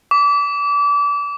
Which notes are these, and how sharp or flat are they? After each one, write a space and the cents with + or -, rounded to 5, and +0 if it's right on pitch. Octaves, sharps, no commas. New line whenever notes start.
D6 -30